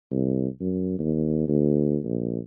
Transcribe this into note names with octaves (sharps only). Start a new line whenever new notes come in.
C2
F#2
D#2
D2
A#1